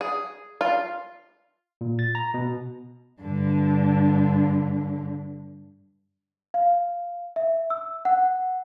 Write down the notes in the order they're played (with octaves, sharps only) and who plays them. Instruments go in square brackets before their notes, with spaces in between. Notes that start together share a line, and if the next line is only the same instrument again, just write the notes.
[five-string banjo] G#4
F4
[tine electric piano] A#2
A6
A#5
B2
[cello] G2 D3
[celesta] F5
E5
E6
F#5